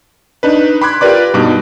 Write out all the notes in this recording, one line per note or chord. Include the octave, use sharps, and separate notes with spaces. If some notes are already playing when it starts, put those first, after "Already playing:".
D4 D#4 B4
B5 C6 D6 F#6 G#6
F4 G4 A#4 B4 D5 D6
G2 B2 D#4 D6